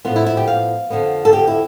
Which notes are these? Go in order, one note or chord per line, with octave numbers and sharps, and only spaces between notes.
A2 F3 B3 F4
E4
E4
G4
F5
F2 D3 F3 B3
A4
G4
E4